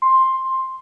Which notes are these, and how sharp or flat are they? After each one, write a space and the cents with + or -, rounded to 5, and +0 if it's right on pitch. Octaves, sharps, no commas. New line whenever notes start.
C6 +10